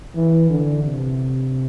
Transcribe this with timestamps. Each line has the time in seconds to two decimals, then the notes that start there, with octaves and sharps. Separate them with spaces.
0.15 E3
0.50 D3
0.83 C3